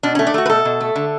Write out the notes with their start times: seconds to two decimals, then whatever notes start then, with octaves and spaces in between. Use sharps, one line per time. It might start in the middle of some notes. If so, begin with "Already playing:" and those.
0.03 B2 D4
0.15 A3 C#4
0.27 D4
0.34 A3 F#4
0.46 B4
0.50 B2 A4
0.65 B2
0.81 A3
0.96 D3